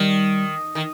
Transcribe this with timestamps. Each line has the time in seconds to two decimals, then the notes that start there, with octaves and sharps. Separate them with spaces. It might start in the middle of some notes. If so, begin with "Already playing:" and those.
Already playing: D#3 G3
0.75 D#3